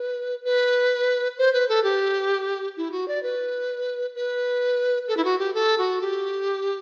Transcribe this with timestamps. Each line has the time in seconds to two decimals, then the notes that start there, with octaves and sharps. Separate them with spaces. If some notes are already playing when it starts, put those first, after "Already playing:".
Already playing: B4
0.45 B4
1.38 C5
1.53 B4
1.69 A4
1.84 G4
2.77 E4
2.92 F#4
3.08 D5
3.23 B4
4.16 B4
5.08 A4
5.17 E4
5.25 F#4
5.39 G4
5.54 A4
5.78 F#4
6.01 G4